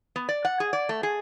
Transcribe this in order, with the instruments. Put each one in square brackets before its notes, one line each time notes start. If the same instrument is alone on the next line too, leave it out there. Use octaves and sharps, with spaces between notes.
[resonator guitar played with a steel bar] B3
D5
F#5
G#4
D5
A3
G#4